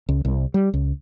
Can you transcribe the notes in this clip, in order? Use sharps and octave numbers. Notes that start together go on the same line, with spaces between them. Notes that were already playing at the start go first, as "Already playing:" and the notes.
C#2
C2
G3
C#2